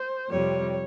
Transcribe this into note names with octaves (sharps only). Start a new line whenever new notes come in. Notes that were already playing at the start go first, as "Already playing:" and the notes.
Already playing: C5
F2 C3 G3 C#5